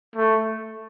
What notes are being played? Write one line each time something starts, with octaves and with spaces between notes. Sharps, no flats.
A3